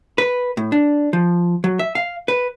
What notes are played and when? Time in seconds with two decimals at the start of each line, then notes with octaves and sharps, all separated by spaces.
0.18 B4
0.57 A2
0.72 D4
1.13 F3
1.64 F#3
1.79 E5
1.95 F5
2.28 B4